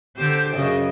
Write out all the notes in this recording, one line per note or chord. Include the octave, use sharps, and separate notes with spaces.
D3 G4 C5
F#2 C#3 D#5